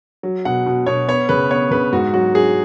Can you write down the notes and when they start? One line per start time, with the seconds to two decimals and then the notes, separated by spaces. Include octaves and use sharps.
0.23 F#3
0.45 B2 F#5
0.66 B2
0.86 B2 C#5
1.08 B3 C#5
1.29 C#3 B4
1.51 B3 C#5
1.71 C#3 B4
1.92 G#2 F#4
2.13 F#3 F#4
2.34 F#3 G#4